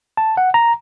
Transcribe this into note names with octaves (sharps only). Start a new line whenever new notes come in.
A5
F#5
A#5